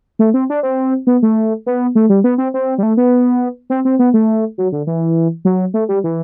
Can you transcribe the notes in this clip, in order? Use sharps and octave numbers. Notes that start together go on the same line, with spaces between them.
A3
C4
D4
C4
B3
A3
B3
A3
G3
B3
C4
C4
G3
A3
B3
C4
C4
B3
A3
F#3
D3
E3
F#3
A3
G3
E3